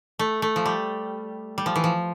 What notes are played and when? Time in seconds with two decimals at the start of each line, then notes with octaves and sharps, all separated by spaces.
0.19 A3
0.42 A3
0.56 F3
0.66 G3
1.58 G3
1.66 F3
1.76 E3
1.84 F3